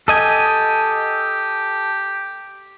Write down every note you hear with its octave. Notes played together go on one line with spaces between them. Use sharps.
G4 A4 D#5 G#5